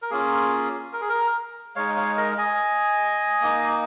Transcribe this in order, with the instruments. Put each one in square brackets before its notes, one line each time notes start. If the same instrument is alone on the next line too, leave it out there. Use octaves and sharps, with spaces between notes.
[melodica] A#4
A#3 C#4 F4 G#4
A#4
G#4
A#4
G#3 D#4 C#5 F5
C#5 F5
A#4 D#5
D#5 G#5
A#3 D#4